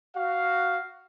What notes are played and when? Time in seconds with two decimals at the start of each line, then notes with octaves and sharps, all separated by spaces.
0.16 F#4 F5